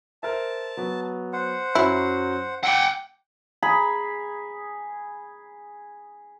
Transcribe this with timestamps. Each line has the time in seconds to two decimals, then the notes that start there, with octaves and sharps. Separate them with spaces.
0.23 A#4 C5 E5 A5
0.77 F#3 B3
1.33 C5 F#5
1.75 F#2 F#3 C#4 E4
2.64 F#5 G5 D6 E6
3.62 G#4 A#5 B5